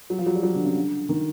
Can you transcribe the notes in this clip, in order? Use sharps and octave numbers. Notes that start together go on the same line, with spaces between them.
F#3
F3
F#3
G3
F#3
D3
C#3
D3
D#3